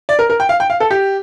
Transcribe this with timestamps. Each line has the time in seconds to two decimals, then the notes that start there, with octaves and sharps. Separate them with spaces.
0.09 D5
0.19 A#4
0.30 A#4
0.40 G5
0.49 F5
0.60 G5
0.70 F5
0.80 A4
0.91 G4